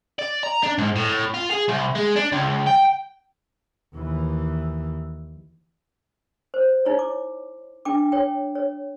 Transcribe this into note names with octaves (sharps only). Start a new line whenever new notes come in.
D5
A#5
D4
G#2
A2
F4
G#4
C2
G#3
D4
C#2
G5
D#2 E3
C5
D#4 E4 C#5
D6
D4 G5 D6
C#5 G5
C#5